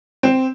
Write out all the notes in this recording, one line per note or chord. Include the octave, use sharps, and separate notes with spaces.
C4